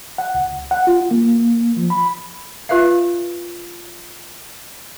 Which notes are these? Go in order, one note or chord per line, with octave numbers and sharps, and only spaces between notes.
F#5
C#2
F#5
F4
A#3
F3
B5
F4 B4 E5 F5